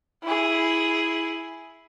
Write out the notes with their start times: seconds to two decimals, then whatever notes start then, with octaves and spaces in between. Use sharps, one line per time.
0.24 E4 G#4